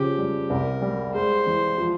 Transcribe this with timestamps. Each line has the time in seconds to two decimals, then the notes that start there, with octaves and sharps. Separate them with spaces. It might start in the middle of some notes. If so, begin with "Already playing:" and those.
Already playing: C#3 F3 G4
0.18 G3
0.50 C2 A#4
0.82 G3
1.14 G#3 C5
1.47 E3
1.78 F3